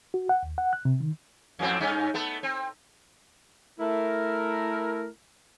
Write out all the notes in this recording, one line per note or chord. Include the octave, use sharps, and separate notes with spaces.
F#4
F#5
D#2
F#5
F#6
C3
D#3
F2 A2 C4
G2 C#4 D#4
A3 B3 A4
C4
A3 E4 A#4